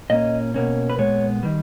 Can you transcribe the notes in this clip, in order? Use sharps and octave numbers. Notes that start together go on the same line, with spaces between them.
A#2 A#3 C#4 D#5
B2 A#3 C#4
B4
A#2 G#3 B3 C#5
D#3 G3